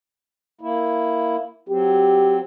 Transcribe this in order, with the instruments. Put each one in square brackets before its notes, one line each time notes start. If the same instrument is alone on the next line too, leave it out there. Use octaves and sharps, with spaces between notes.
[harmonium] A#3 E4
[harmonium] F#3 C4 [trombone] G4